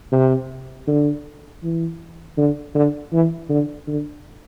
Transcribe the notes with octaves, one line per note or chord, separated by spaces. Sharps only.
C3
D3
E3
D3
D3
E3
D3
D3